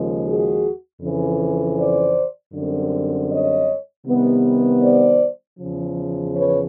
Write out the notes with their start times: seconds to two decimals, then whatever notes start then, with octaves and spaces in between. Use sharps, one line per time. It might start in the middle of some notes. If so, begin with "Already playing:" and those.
Already playing: D#2 C#3 F3 G#3
0.25 F#4 G#4
1.01 F2 C#3 E3
1.78 C5 D5
2.54 F#2 D3 G3 C4
3.30 C#5 D#5
4.06 C3 D#3 G3 B3
4.83 C5 D5
5.59 E2 C#3 F3
6.35 B4 C#5